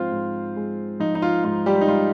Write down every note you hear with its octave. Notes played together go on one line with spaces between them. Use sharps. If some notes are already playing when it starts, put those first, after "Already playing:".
Already playing: G#2 F3 C4 F4 C5
G#2
G#3
F3 D#4
D#4
F4
G#2 F4
G3 G4
D#4
G#2 F4